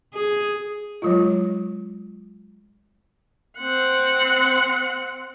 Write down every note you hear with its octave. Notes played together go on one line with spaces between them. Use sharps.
G#4
F#3 G#3 F4
C4 F#5